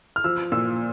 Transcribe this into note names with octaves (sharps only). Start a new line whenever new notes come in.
F6
F3 E6
A#2 E6